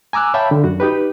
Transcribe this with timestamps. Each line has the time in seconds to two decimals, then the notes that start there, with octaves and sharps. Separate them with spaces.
0.13 G#5 A#5 D6 E6 F#6
0.34 C#5 E5 F5 G5 A5 B5
0.51 D3
0.64 F#2 F#4
0.80 D#4 G4 B4